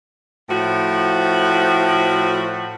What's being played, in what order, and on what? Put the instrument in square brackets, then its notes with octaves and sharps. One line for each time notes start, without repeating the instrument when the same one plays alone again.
[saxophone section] A2 F3 F#4